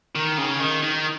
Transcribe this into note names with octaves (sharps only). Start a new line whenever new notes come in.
D#3
C#3
D#3
D#3